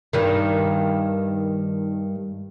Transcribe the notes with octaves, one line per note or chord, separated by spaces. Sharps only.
G2 D#3